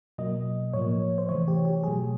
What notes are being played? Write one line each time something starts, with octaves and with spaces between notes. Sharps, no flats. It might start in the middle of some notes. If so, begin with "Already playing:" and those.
B2 F#3 A#3 D#5
A2 F3 A#3 C#5
C5
C3 E3 A3 C#5
G4
G4
B2 F#3 A3 G#4